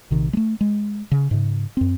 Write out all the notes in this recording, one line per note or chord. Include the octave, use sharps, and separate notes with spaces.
A#1 C3 D#3
G#3 A3
G#3
C#3
G#2 C#3
F#2 C4